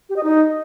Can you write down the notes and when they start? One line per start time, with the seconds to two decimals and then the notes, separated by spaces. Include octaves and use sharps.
0.09 G4
0.16 D#5
0.23 D#4